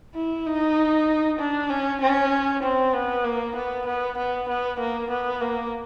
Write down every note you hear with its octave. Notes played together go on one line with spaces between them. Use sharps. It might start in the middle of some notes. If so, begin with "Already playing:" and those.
E4
D#4
D4
C#4
C#4
C4
B3
A#3
B3
B3
B3
B3
A#3
B3
A#3